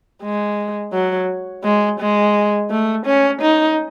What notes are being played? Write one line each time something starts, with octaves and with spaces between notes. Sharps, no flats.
G#3
F#3
G#3
G#3
A3
C#4
D#4